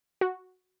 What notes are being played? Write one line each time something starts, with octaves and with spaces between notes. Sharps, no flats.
F#4